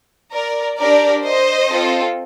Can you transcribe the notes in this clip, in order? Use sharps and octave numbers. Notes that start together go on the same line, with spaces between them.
A#4 D5
D4 G4 A#4 D5
C5 D#5
C4 F4 A4